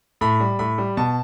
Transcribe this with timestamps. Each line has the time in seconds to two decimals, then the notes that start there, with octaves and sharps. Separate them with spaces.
0.21 A2 B5
0.40 G3
0.59 A2 B5
0.78 G3
0.97 B2 A5